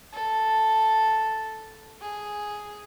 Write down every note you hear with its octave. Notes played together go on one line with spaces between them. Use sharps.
A4
G#4